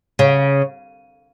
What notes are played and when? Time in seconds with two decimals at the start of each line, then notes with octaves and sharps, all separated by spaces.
0.19 C#3